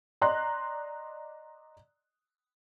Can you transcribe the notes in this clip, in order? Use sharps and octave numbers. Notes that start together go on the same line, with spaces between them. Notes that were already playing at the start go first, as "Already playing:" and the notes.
D5 D#5 A#5 C6 F#6